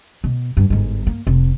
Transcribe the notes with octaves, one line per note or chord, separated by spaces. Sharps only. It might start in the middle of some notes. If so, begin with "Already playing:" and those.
B2
G2
G1 G#2
A#3
F1 C3